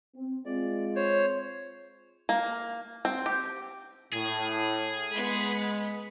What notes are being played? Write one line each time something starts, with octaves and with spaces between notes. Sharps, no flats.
C4
G#3 C4 F4 D5
C5 C#5
A#3
C4
G4
A2 G#4
G#3 B3 B5